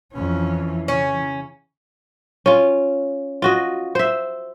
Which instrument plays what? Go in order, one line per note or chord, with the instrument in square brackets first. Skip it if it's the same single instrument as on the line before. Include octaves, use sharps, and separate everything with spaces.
[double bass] F2 C#4 [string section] E3
[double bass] C#3 [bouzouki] C#4
[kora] C#4 F4
F4 F#4 D#5
C5 E5